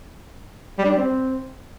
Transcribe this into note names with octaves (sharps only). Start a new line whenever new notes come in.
G3
D4
G3
C4